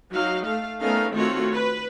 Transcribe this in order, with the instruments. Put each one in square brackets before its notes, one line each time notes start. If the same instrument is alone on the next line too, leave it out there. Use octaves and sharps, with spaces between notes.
[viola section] F#3 D#4 F5
A3 F5
A3 B3 C#4 D#4 A#4 F5
D#3 A3 C4 F4 F#4 C#5
B4